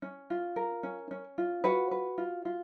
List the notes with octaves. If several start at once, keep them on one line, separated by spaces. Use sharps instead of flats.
C#4
F4
A#4
C#4
C#4
F4
F#4 B4 F#5
B4
F4
F4